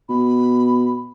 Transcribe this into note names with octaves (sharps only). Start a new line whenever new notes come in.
B2 B5